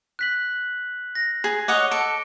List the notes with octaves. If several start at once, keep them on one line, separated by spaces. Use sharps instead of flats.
F#6 B6 F#7
A#6
G#4
C#5 D#5 F#5 D6 G7
A4 D7